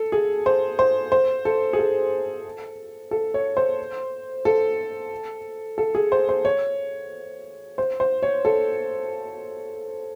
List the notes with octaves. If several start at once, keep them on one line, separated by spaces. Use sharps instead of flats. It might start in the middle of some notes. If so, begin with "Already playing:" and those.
Already playing: A4
G#4
C5
C5
C5
A4
G#4
A4
A4
C#5
C5
A4
A4
G#4
C5
C5
C#5
C5
C5
C#5
A4